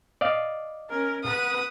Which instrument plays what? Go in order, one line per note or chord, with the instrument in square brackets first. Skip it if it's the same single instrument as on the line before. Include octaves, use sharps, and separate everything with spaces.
[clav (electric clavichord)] D5 D#5 F5
[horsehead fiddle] C#4 A#4
[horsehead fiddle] B4 F#5 [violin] D#6